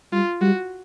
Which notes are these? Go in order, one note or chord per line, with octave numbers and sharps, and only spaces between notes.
G3 F4
G3 F#4